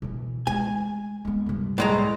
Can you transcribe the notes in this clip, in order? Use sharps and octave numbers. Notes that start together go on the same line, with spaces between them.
B2 E3
G#3 A3 G#5
G#3 B3
C2 G2
A2 G#3 A#5